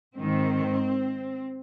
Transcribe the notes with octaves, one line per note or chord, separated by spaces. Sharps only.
G#2 D#3 C4